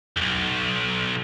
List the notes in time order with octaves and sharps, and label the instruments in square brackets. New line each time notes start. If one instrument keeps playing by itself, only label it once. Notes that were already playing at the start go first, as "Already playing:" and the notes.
[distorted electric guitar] B1 F2